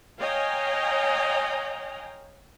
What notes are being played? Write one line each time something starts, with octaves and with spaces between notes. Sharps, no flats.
C#5 D#5 F5 G5 G#5 A#5